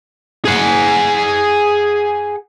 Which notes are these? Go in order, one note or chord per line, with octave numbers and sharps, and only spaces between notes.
G#4 F#5